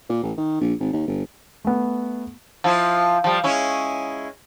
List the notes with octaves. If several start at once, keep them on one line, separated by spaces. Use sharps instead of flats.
A#2
A1
D#3
A#1
G#1
D#2
G1
A3 B3
F3 E4 F4
F3 G3
G#3 C#4 E4